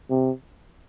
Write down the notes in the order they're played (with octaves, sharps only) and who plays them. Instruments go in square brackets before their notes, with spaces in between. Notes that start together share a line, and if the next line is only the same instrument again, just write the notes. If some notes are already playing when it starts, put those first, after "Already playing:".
[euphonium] C3